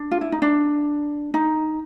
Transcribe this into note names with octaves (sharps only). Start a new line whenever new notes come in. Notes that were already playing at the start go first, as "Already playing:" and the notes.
Already playing: D4
F4
E4
D#4
D4
D#4